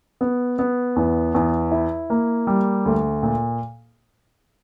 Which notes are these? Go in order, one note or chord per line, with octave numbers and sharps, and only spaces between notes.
B3
B3
E2
E2
E4
A#3
G3
D2
A#2